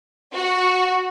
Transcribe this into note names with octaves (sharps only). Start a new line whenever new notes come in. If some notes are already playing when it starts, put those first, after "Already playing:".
F#4